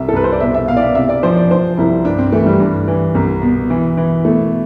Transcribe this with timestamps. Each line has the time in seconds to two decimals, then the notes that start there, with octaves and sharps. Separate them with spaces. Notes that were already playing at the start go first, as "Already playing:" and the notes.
Already playing: C2 E5
0.09 A4
0.13 C2 B4
0.24 C5
0.32 D5
0.40 B2 E5
0.54 E5
0.68 B2 F5
0.77 D5
0.82 E5
0.95 C3 E5
1.09 D5
1.23 F3 C5
1.36 D5
1.51 F3 C5
1.77 C2 E4
2.05 G2 D4
2.18 C4
2.32 E3 A3
2.46 G3
2.60 G2
2.88 E3
3.15 C2
3.42 B2
3.70 E3
3.97 E3
4.25 B2 A3